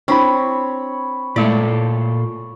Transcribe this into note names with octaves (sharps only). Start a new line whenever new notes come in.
C4 D4 E4 C#5 B5
A#2 G#3 A3 E4 F4 A4 D5